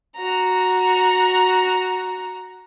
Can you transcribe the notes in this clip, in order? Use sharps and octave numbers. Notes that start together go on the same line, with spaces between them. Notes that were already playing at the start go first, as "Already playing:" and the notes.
F#4 A#5